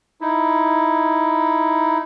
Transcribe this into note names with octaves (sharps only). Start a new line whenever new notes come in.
D#4 E4